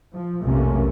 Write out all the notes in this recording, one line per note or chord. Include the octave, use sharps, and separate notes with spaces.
F3
B1 F2 C3 A3 A#3 C#4